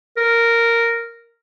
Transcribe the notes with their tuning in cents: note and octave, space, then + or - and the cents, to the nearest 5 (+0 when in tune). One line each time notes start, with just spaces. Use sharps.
A#4 -5